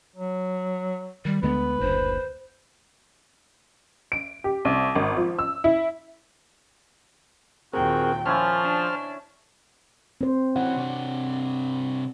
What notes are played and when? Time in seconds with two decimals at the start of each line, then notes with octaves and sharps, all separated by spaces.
0.16 F#3
1.25 D#3 G3
1.43 D2 D3 G#3 B3 B4
1.80 F#1 D2 C5
4.12 D7
4.44 G4
4.65 C2
4.95 G#1
5.17 F3
5.39 E6
5.64 E4
7.73 D#2 A#2 C4 F#4 G#4 A#4 G5
8.26 F3 C#4 E4 C5 G#5 A5 F6
8.63 D4
10.21 C4 C5
10.56 E3 C#4 F#5
10.76 C3 D4